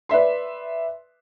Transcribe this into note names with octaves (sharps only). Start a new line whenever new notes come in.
B4 D5 E5 C6